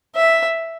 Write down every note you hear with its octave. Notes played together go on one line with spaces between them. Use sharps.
E5